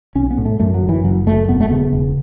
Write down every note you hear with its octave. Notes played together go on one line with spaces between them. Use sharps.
B1 C#4
B3
A2
A3
F#2 A3
F#3
F#1
E3
F#1 F#3
F#2 A3
E1 B3
A3
C#3 B3
E1